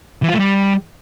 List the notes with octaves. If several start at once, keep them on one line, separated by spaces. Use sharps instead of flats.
E3
F4
A3
G3